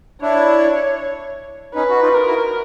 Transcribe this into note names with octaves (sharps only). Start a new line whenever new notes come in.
D4 E4 C#5
C#4 D#4 B4
F#4
D#4 F4
A#4
E4 F#4